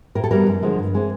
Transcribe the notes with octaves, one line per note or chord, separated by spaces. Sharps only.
A2 A#4
A4
E3 G3 B3 A#4
F#2
D3 F3 G#3
G2
E3 G#3 C4